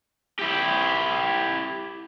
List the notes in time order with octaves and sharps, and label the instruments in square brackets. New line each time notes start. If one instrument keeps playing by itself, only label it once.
[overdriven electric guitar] E4 G4